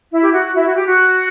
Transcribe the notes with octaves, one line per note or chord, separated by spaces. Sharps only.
E4
G4
F#4
E4
F#4
G4
F#4